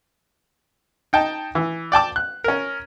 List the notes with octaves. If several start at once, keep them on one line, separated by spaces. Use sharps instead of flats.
D#4 G5 A5
E3
D5 G5 A5 D6
F#6
C#4 A#4